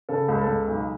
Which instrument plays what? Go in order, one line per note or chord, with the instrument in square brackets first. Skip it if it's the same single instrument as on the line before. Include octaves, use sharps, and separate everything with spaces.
[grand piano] C#3 A4
C#2
A4
C#2
B1